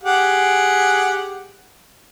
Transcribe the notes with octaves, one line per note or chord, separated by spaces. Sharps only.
G4 G#4 F#5